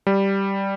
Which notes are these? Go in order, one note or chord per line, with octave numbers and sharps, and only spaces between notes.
G3